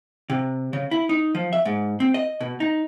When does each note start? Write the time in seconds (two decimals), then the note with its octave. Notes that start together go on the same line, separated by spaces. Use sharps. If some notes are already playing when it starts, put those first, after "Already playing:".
0.30 C3
0.73 C#3
0.91 E4
1.09 D#4
1.35 F3
1.53 E5
1.65 G#2
2.00 C4
2.14 D#5
2.40 B2
2.60 D#4